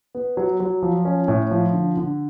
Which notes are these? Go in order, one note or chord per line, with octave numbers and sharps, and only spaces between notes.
B3
F#3
F#3
F3
C#4
A2
F3
D3
D3